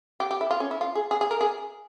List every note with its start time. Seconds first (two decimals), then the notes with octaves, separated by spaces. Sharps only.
0.20 G4
0.31 G4
0.41 E4
0.51 F4
0.60 C#4
0.71 E4
0.81 F4
0.95 G#4
1.11 G#4
1.21 G#4
1.31 A#4
1.41 G#4